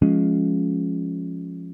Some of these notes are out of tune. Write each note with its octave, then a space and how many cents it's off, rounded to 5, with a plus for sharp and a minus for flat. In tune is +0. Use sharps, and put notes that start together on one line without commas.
F3 +0 G#3 +5 C#4 +0